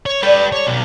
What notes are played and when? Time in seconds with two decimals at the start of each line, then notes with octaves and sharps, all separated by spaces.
0.06 C#5
0.23 G3 A4 B4 D5 G5
0.52 C#5
0.67 B1